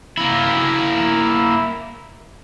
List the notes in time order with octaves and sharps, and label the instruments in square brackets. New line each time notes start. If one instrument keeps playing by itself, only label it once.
[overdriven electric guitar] A#3 E4